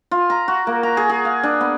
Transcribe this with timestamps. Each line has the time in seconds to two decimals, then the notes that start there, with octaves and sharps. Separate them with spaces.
0.11 F4
0.30 A#5
0.48 F#4
0.67 A#3
0.83 A#5
0.97 G#4
1.09 G#4
1.25 F5
1.43 D4
1.61 B3